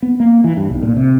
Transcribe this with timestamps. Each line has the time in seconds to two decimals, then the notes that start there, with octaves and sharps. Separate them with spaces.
0.02 B3
0.20 A#3
0.44 E3
0.57 G2
0.70 B1
0.82 A#2
0.97 C3